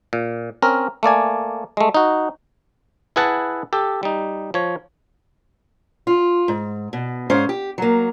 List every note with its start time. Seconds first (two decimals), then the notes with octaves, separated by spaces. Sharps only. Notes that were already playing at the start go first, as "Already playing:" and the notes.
0.13 A#2
0.62 C4 C#4 A#4
1.03 A3 A#3 D5 G#5
1.77 G#3 A3
1.94 D#4 F#4
3.16 E4 G#4 B4 F#5 A5
3.73 G4 A4
4.03 G3 D#4
4.54 F3 C#5
6.07 F4
6.48 G#2
6.93 B2
7.30 G#2 C#4 C5 F5
7.49 G4
7.78 F#3 A#3